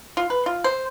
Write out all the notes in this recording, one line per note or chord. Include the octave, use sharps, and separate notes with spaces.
F4
B4
F4
C5